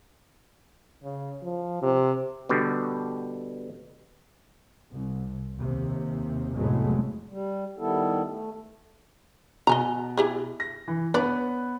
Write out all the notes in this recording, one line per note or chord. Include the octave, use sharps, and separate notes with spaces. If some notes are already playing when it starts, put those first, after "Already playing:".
C#3
F3
C3
B2 D3 G3
C2
D#2 C3
F1 A2 F#3 G#3 A3 B3
G3
D#3 G3 B3 E4 A4
A3
B2 D#5 G#5 A#5
E4 G4 G#4
A#6
E3
B3 D4 B4 C#5 D5